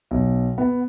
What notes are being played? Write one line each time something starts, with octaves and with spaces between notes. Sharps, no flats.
B1
B3